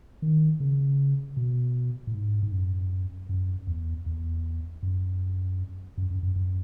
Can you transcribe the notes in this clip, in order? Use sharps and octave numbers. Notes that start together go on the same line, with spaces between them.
D#3
C#3
B2
A2
G#2
G#2
F#2
F#2
E2
E2
F#2
F#2
F#2
F#2
F#2